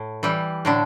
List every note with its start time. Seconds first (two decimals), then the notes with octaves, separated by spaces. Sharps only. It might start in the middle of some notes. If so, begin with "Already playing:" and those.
Already playing: A2
0.23 E3 G3
0.65 A2 D3 D4